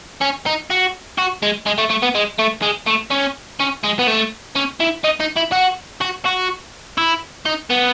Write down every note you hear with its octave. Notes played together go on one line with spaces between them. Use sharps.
C#4
D#4
F#4
F#4
G#3
G#3
A3
A3
B3
G#3
A3
G#3
A3
C#4
C#4
G#3
B3
A3
C#4
E4
D#4
D#4
E4
F#4
F#4
F#4
E4
D#4
B3